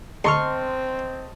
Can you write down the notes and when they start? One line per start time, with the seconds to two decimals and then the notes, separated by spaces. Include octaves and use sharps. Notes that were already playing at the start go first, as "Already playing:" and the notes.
0.25 D2 C4 D#5 A5 C6 C#6 F6